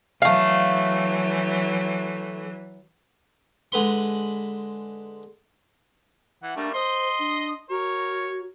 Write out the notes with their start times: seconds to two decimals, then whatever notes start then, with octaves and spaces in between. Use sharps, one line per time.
0.22 E3 F#3 A3 F5
3.72 D3 G#3 B4 B5 C6
6.43 E3 F#5
6.56 G3 A3 A#3 D4
6.74 C5 D#5 C6 D#6
7.19 D4
7.70 F#4 A#4 C#5